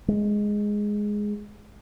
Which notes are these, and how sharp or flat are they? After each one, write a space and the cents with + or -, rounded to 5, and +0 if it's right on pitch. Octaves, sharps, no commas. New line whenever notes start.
G#3 +0